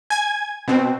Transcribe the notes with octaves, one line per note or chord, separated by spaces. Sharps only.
G#5 G#6
B2 C4